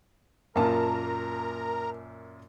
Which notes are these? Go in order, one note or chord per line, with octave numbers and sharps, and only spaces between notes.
F#2 A#2 A#3 F4 A#4 A5 A#5